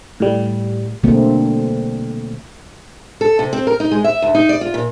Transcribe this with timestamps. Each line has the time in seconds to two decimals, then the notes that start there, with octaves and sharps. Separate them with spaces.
0.20 A2 G3
1.03 B2 D3 G3 A3 A#3 C4
3.21 A4
3.39 C3
3.53 C4
3.67 A#4
3.80 D#4
3.91 G#3
4.04 E5
4.22 D2
4.35 D#4
4.49 D5
4.61 F4
4.74 A#2